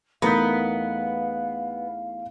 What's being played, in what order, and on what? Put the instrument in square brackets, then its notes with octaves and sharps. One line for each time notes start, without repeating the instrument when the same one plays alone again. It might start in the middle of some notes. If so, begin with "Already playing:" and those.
[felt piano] E2 A3 [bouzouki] B3 [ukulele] D#4 A#4 [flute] F5